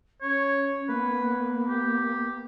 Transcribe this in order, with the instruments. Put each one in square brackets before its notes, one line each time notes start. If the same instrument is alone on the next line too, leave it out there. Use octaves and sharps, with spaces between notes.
[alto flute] C#4 [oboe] C#5
[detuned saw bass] A#3 [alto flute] B3 [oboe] B4
[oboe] G4